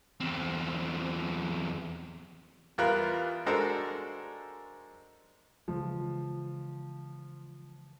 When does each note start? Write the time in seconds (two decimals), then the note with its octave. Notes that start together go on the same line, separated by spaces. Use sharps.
0.20 E2 C4
2.78 E2 G3 F4 A#4 B4 F#6
3.46 G#3 D4 F#4 A4 A#4 C5
5.68 C#3 E3 F3 G#3